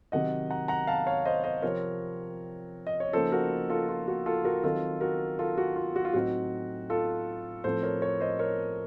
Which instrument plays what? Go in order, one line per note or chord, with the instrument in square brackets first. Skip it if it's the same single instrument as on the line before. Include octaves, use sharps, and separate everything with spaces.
[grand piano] C3 D#3 F#3 D#5 F#5
F#5 A#5
F#5 A#5
F5 A5
C#5 F5
C5 D#5
C5 D#5
C3 F3 C4 A#4 C#5
D#5
C#5
C#3 F3 A#3 D#4 A4 C5
F#4 A#4
F4 A4
F4
F#4
F4 A4
F#4 A#4
D#3 F#3 C4 D#4 F4 A4
F#4 A#4
F4 A4
F#4
F4
F#4
F4
A2 F#3 C4 D#4 F#4
F4 A4
A2 F3 C4 A4 C5
A#4 C#5
A#4 C#5
C5 D#5
A#4 C#5